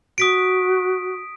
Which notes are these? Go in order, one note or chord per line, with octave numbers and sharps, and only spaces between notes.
F#4 D#6 B6 D7